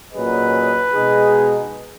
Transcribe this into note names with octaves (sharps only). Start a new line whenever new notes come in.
A#2 F#3 C#4 G#4 B4 D#5
B2 G#3 D#4 G#4